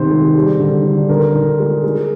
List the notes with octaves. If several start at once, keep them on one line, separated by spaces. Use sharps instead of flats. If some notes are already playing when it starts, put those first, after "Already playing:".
Already playing: C3 D#3 C5
G#3
G3
D3
D3
D3 A#4
D3
G#3
G#3